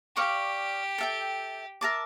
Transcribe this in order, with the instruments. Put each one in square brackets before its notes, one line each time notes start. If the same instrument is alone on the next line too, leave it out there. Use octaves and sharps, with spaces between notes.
[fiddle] G4 [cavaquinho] D5 F5 C#6
[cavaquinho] A4 E5 G5
A#4 E5 A5 D6